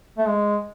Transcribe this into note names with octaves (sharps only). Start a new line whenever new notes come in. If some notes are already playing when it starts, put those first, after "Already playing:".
A3
G#3